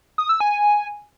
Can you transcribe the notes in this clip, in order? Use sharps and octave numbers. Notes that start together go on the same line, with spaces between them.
D#6
E6
G#5